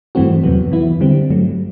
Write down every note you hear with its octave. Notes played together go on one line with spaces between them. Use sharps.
G2 E3 A3 C4 F#4
E2 C3 F#3 B3
E3 B3 E4
D3 G3 C4
G2 F#3 A3